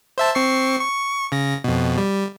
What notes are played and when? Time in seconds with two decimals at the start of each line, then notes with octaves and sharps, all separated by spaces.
0.18 C5 E5 A5
0.35 C4 C#6 C7
0.80 C#6
1.32 C#3 A#6
1.64 F2 B2
1.98 G3